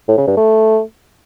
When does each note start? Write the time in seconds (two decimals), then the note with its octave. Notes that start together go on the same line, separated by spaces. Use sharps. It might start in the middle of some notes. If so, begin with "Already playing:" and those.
0.08 A2
0.18 C#3
0.27 G2
0.37 A3